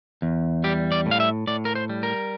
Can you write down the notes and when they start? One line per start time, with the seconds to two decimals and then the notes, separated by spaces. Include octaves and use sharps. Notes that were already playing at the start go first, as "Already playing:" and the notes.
0.22 E2
0.64 G3 G4
0.92 D5
1.06 A2
1.11 F5
1.20 E5
1.47 A2 D5
1.65 A#4
1.75 C5
1.89 G3
2.03 A#4